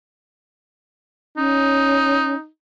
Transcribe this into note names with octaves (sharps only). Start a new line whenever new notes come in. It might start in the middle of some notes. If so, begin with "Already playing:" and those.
C#4 D#4